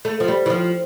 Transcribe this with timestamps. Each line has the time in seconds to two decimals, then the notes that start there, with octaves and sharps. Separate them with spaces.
0.05 A3
0.20 F3
0.28 G3
0.46 E3
0.50 F3